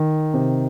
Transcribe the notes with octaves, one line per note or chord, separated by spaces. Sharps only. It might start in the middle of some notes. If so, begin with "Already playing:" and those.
Already playing: D#3
C3